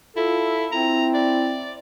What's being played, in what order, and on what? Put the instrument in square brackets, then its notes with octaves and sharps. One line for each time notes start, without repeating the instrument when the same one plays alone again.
[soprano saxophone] E4 [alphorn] F4 [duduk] A4
[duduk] C4 [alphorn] E4 [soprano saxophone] A#5
[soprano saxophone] D5